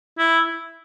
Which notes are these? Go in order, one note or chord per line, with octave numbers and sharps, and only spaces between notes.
E4